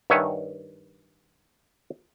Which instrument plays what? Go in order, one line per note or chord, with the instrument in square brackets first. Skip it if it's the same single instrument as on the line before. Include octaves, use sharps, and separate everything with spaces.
[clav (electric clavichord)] G2 D#3 C#5 E5 F#5 G#5